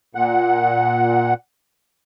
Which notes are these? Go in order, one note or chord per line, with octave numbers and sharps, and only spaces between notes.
A#2 F#5